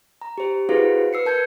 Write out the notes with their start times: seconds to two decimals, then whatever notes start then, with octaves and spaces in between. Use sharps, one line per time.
0.21 A#5
0.38 G4 C5
0.69 E4 F#4 G#4 B4 C5 F5
1.13 B4 E6 C7 C#7
1.26 A#4 A5 G6 G#6 C#7